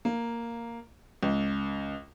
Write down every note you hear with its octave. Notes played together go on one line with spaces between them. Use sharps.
A#3
C#2